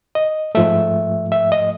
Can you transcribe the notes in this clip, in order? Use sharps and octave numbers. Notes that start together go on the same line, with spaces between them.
D#5
G#2 F3 A3 E5
E5
D#5